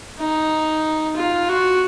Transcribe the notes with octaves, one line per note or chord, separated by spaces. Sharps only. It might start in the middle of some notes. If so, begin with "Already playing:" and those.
D#4
F4
F#4